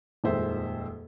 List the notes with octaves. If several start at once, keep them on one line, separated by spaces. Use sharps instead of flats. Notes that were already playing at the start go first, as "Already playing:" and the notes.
D#1 F2 D#3 G#3 C5 E5